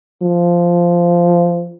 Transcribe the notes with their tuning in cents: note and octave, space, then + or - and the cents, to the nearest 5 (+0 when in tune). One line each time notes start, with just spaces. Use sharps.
F3 -10